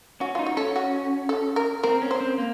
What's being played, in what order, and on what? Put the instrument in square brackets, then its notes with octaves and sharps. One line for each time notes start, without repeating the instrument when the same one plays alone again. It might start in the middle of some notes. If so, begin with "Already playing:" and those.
[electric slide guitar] C#4 [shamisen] F#4
[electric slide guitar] D#4 [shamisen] F4
[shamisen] F#4
[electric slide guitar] C#4 [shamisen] A4
[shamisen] F#4
A4
A#4
[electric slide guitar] C4 [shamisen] A#4
[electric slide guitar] C#4
[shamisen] C5
[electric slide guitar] C4
A#3